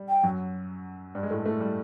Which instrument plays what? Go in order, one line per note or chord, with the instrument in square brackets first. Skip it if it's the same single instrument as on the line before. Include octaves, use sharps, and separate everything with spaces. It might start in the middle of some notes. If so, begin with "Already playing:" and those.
Already playing: [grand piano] G3
[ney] G5
[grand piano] F#2 F#3
G2 G3
G#3
A2 A3
A2 A3
G3